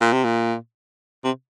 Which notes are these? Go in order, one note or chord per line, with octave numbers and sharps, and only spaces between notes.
A#2
C3
A#2
C3